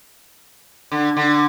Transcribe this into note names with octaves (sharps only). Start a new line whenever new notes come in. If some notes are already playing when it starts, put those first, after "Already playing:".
D3
D3